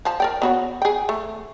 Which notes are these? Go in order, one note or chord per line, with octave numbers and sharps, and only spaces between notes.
F3 A5
A#4 D5 G5
B3 F#4 C#5
G#4 G5
A3